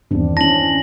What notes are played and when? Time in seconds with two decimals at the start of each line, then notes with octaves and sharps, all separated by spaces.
0.11 E2 G2 D#3 C4 D4
0.37 C#4 E4 A5 A#6 F#7